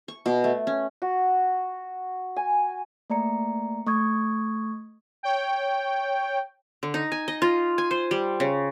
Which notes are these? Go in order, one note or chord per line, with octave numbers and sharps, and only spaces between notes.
C#6
B2
A3
C#4
F#4
G#5
A3 A#3 D5 A#5 C#7
A3 C#6 D#6 G#6
C#5 G5
D3
D#4
G#5
D#5
F4
G#5
C5
G3
C#3